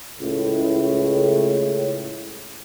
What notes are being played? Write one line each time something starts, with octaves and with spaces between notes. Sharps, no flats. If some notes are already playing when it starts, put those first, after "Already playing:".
C#2 A2